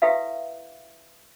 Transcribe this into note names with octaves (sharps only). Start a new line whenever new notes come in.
E4 G4 A4 B4 E5 F5